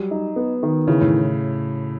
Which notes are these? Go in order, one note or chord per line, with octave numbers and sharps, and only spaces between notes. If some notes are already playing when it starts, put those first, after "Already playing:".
Already playing: F#3 G3
D#4
B3
D#3
C#3 E3
A2